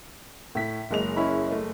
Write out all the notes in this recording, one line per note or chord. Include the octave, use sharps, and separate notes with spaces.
A2 B6
F#1 G#3 F7
C#4 E4 B5
A3